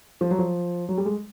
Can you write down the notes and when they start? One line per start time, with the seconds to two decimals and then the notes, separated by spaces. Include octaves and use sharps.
0.21 F3
0.31 F#3
0.39 F3
0.89 F#3
0.98 G3
1.06 G#3